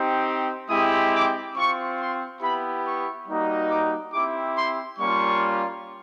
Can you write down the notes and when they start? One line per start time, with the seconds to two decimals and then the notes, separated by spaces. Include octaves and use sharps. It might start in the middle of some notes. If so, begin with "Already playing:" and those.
Already playing: C4 D#4 G4
0.69 G#3 C4 E4 G4 D#6
1.13 D6
1.56 C4 F4 C#6
1.98 C6
2.41 B3 E4 G4 B5
2.85 C#6
3.27 G3 A#3 D#4 F#4
3.69 D6
4.13 C4 E4 G4 D6
4.56 C6
4.99 G3 A#3 C#4 F4 C#6